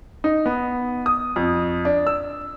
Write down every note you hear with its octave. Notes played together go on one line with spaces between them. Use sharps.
D#4
B3
D#6
F2
D4
E6